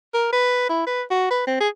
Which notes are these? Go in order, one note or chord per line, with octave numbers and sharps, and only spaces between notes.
A#4
B4
E4
B4
F#4
B4
C4
G#4